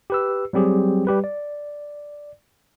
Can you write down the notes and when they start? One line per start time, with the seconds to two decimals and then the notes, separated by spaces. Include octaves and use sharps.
0.10 G4 B4 E6
0.53 F#3 G3 C4 G4 G#4
1.07 G3 G4 B4
1.24 D5